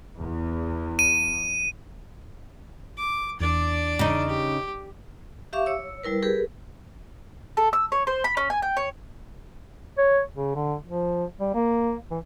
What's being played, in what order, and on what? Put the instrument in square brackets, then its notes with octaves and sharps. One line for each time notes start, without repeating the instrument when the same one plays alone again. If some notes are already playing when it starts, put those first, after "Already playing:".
[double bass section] E2
[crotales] D#7
[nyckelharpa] D6
[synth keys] E2 [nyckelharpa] D4 D5
[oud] C#3 D#4
[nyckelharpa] G4
[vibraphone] G4 E5 F5 C#6 D6
C#5 E6
G3 E4 A#4 B4
G4 G#4 A#4 B4
[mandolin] A4
E6
C#5
C5
B5
C#4
G#5
G5
C#5
[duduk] C#5
C#3
D3
F3
G3
A#3
E3